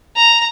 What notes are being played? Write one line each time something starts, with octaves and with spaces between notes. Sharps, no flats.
A#5